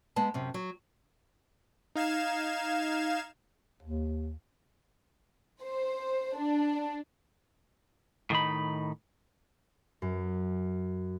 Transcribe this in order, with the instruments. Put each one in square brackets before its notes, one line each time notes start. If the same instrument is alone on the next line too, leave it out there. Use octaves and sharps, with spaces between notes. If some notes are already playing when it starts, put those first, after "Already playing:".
[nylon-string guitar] G#3 B3 A5
F#2 C3
F#3
[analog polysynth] D#4 F5 G#6 E7
[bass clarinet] D#2
[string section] C5
D4
[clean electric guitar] A2 D#3 D#4 B5
[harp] F#2